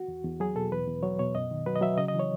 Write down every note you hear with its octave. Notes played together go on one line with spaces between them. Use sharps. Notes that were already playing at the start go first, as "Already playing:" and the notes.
Already playing: F#4
E2
E2
F#3 G#4
B2 A4
E2 B4
E2
F#3 C#5
B2 C#5
F#2 D#5
D#3
F#3 B4
D#5
F#3 E5
C#3 D#5
D#5
E3
C#5